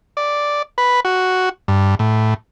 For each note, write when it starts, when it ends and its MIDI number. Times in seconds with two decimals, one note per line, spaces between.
0.17 0.62 74
0.78 1.00 71
1.05 1.49 66
1.68 1.95 43
1.99 2.34 45